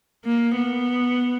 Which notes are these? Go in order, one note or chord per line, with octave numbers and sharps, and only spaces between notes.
A#3
B3